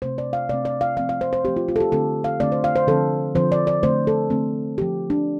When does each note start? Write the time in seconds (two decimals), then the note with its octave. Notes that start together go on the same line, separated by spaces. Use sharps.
0.02 C3 A3 C4 C5
0.18 D5
0.33 F5
0.49 C3 A3 C4 D5
0.65 D5
0.81 F5
0.97 F3 A3 C4 F5
1.09 F5
1.21 C5
1.33 C5
1.45 F3 A3 C4 G4
1.56 F4
1.68 F4
1.76 A4
1.80 G4
1.92 D3 A3 C4 A4
2.24 F5
2.40 D3 A3 C4 D5
2.52 C5
2.64 F5
2.76 C5
2.87 D3 F3 C4 A4
3.35 D3 F3 C4 C5
3.52 D5
3.67 D5
3.83 D3 A3 C4 C5
4.07 A4
4.30 D3 A3 C4
4.78 F3 C4 G4
5.10 D4